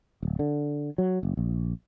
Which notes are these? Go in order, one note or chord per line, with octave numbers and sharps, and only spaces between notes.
D1
D3
F#3
F#1
A#1